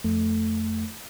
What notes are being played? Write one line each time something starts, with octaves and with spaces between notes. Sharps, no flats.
F2 A3